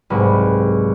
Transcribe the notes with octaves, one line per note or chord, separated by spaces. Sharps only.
F#1 C2 G#2 B4